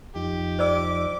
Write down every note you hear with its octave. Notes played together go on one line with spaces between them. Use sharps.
F2 F3 D#4 G4
C5 D5 D6 E6